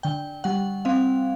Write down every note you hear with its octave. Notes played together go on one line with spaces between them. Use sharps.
D3 G5
G3 F#5
C4 F5